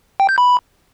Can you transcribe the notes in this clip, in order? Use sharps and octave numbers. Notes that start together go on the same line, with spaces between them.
G5
G6
B5